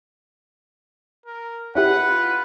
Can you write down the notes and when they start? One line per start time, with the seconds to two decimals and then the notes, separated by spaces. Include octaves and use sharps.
1.26 A#4
1.75 C#4 E4 G4 B4 F#5
2.07 F4